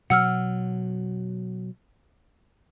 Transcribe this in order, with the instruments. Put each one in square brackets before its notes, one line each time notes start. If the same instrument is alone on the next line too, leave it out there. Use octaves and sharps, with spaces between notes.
[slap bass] B2 F#3 [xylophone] F#5 E6 F6